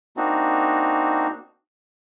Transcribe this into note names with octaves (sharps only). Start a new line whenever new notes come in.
A#3 C4 D4 D#4 F#4